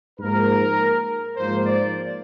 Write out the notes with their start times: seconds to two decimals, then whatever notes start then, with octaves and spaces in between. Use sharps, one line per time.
0.19 G#2 F3 A#3 A#4
1.36 G#2 F3 A#3 C5
1.66 D5